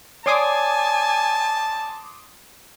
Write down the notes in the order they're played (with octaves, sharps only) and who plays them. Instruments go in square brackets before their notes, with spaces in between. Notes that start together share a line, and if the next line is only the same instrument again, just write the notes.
[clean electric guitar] C#5 D5 [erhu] G#5 [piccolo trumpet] A5 [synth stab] C6 D6 D#6